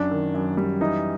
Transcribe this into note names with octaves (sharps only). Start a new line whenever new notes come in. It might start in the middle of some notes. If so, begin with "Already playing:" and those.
Already playing: F#2 D4
D#3
F#2
G3
E3 D#4